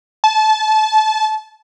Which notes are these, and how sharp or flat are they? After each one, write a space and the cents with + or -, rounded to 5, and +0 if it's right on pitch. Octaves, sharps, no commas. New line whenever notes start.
A5 -25